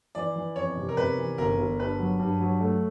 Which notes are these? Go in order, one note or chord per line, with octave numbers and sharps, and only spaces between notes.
E3 D5
E3
F2 C#5
C3
A#4
C3 B4
E3
G1 A#4
G1
G2 B4
F#3
G2
F#3
A3